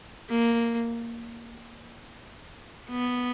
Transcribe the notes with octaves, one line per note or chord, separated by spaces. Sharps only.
A#3
B3